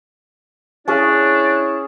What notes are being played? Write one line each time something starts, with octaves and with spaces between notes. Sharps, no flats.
C#4 D4 E4 G#4 C#5